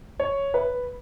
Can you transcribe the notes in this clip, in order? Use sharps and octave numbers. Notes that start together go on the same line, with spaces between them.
C#5
B4